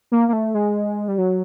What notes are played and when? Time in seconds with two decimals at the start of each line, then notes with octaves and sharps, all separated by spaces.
0.12 A#3
0.29 A#3
0.33 A3
0.54 G#3
1.08 G3
1.18 F#3